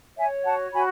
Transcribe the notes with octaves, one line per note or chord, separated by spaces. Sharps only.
C#5 E5 G#5
F#4 F#5 A5
F#4 G#5 B5